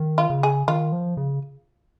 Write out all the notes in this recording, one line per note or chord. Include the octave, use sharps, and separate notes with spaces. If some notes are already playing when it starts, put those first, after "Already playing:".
Already playing: D#3
F4
C#3
G#4
D#3 F4
F3
C#3